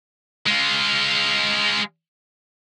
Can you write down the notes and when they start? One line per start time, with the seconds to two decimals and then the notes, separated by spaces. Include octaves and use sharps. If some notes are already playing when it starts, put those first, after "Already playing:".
0.47 G#3 F4